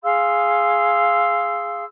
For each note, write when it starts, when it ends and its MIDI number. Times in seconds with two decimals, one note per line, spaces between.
0.03 1.83 68
0.03 1.83 77
0.03 1.83 84
0.03 1.83 88